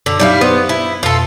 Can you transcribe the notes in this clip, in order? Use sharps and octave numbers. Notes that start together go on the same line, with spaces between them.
F#2 D3
F#3 G3 D#4 E4 D5 F5
B3 C5 D5 C6
E4
F2 B2 F4 A4